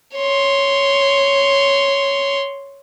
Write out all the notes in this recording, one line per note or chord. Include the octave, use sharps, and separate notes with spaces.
C#5 C6